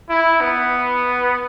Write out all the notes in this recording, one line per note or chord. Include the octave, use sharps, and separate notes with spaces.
E4
B3